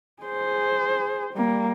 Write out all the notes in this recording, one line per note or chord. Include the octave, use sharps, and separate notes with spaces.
G#4 C5
G3 A#3